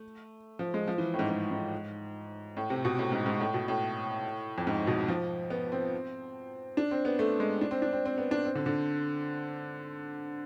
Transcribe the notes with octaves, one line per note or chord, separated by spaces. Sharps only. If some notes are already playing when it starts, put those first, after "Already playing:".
Already playing: A3
F3
G#3
F3
E3
A2
G#2
G#2
G#2
A2
C3
B2
A2
G#2
G#2
A2
B2
A2
F2
G#2
B2
F3
B3
C4
D4
C4
B3
A3
G#3
D4
C4
D4
C4
C4
B3
D4
C4
D3
D3